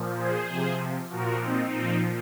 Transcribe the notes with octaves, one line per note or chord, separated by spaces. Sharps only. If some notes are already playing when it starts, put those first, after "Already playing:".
Already playing: A#2 F3
G#4 C5
C3 F3
A#2 F3 F#4 A#4
C4 D#4
A#2 F3